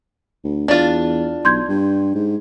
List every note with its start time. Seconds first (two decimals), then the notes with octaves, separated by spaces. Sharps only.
0.44 D2
0.68 E2 D4 F4 D5
1.45 B1 C6 G6 G#6
1.69 G2
2.15 G#2